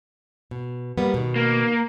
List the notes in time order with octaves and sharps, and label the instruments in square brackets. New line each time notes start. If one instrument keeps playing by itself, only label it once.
[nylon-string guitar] B2
G3 A#3 B3
B2 D#3
[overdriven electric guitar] A#3